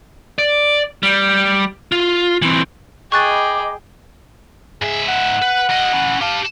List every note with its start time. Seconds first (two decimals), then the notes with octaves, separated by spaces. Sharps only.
0.38 D5
1.03 G3
1.92 F4
2.42 E3 C4
3.12 G#4 D#5 G5 B5 C#6 D6 F#6 A6
4.82 G#2 G#4 E5
5.08 F#5
5.42 B4
5.70 G3 D#5
5.93 C#4 E4
6.21 G4 F5 A5